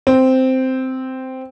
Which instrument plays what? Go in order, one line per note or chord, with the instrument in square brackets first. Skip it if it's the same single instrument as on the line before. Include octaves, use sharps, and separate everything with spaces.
[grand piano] C4